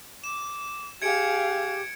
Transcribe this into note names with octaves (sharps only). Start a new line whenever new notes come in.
D6 E7
G4 G#4 F5 G#6 C#7 D7